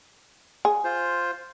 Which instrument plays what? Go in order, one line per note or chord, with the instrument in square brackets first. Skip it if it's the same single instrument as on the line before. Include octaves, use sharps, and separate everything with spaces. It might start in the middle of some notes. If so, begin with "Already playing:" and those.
[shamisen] G#4
[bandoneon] F4 C5